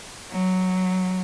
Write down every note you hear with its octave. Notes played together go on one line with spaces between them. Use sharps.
F#3